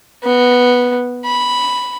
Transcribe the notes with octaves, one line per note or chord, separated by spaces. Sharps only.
B3
B5